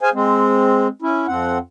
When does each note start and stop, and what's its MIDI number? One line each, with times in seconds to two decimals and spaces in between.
0.01 0.09 68
0.01 0.09 72
0.01 0.09 77
0.01 0.09 80
0.14 0.88 56
0.14 0.88 60
1.02 1.27 61
1.02 1.27 64
1.28 1.58 41
1.28 1.58 60
1.28 1.58 78